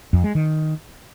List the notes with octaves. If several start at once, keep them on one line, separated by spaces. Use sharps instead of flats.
F2
G#3
D#3